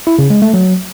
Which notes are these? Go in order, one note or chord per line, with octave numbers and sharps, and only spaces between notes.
E4
C#3
G#3
A3
F#3